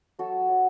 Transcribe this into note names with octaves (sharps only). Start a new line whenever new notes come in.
F#3 F#4 A4
F#3